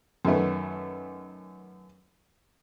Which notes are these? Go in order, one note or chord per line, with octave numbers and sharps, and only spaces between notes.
F#2 D#3 A3 B3